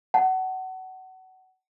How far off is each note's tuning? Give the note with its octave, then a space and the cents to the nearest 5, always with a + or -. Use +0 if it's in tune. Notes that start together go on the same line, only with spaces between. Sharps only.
F#5 +25 A5 +0